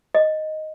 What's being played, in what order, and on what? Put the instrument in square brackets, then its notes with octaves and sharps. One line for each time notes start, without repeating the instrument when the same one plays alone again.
[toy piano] D#5